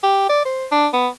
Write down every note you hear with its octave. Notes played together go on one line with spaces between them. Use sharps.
G4
D5
C5
D4
B3